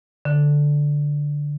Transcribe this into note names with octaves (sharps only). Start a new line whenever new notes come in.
D3